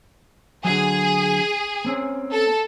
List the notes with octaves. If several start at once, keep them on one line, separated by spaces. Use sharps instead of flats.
D3 F#3 G#4
A#3 C4 C#4
A4